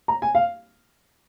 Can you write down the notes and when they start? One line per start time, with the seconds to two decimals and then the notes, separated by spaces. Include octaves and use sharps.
0.08 A#5
0.22 G#5
0.35 F5